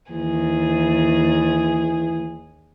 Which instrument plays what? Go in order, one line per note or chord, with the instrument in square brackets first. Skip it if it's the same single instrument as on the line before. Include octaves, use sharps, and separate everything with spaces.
[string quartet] D#2 G#4 [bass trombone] E3